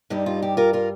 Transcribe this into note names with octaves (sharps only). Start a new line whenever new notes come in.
G2 G3 D#4 G4
F4
G4
F4 A#4
F4 A#4